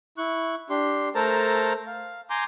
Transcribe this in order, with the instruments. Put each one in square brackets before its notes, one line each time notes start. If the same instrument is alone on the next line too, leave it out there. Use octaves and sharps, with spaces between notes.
[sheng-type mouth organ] E4 C#6 F#6
D4 G4 C6
A3 A4 A#4 C5 A5 A#5
F5
G#5 A#5 C6 D6 G6